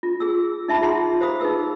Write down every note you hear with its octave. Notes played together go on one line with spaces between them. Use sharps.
F4
G#4 E6
D#4 E5 A5 B5
F4 G#4 F#5 A#5 C6
G4 C5 F5 B5 D#6
D#4 G#4 B4 E6